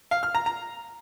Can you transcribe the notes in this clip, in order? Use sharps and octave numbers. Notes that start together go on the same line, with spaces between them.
F5
F6
A#5
A#5